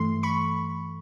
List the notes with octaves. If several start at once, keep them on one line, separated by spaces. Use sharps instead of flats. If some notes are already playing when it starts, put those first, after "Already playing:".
Already playing: G2 E3 A3 C6
B5 C#6